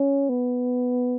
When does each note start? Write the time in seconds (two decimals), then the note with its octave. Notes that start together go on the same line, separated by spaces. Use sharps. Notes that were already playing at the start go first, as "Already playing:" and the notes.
Already playing: C#4
0.29 B3